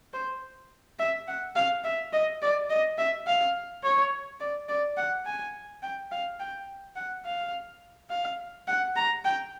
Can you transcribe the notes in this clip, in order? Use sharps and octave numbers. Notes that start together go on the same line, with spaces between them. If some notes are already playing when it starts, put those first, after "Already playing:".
C5
E5
F#5
F5
E5
D#5
D5
D#5
E5
F5
C#5
D5
D5
F#5
G#5
G5
F5
G5
F#5
F5
F5
F#5
A#5
G5